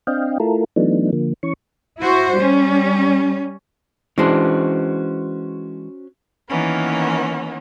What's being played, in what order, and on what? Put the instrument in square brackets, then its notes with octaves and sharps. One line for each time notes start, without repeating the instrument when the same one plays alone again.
[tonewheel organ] C4 D4 D#5 F5 G5
A3 E4 F4 A4 A#4
E3 F#3 A3 B3 D4 D#4
D3 F3 A#3
E3 C#4 C#6
[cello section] E4 F#4 C5
G3 C#4
[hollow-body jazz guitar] E3 G#3 D4 [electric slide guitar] C#4 F#4 C5
[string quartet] D#3 E3 A#3 B3 C#4